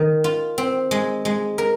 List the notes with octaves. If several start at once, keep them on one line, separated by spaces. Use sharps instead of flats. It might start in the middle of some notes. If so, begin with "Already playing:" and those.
Already playing: D#3
F4
C4
G#3
G#3
A#4